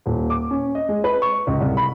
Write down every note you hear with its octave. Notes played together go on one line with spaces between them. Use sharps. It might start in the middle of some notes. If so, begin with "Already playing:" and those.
D#1
D6
C#4
D#5
G#3
B4
C#6
C#2
C2
B5